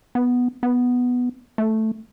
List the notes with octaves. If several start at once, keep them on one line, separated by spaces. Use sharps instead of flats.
B3
B3
A3